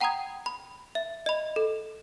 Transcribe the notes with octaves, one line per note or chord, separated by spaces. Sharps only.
F#5 G5 A#5 B5 D#6 G#6
B5
E5
D#5 B5
A4